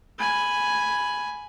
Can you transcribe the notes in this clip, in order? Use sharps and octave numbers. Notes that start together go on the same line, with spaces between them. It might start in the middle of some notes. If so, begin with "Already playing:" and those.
G#5 B5